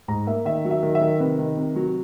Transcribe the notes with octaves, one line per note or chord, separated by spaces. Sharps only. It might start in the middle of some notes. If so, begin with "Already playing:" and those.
G#2 A#5
A#3 E5
D#3 E5
F#3
E5
D#3
E5
D#3
C3 B4
D#3
C3
F#3